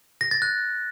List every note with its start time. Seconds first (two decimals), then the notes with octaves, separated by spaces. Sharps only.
0.21 A#6
0.31 A6
0.42 F#6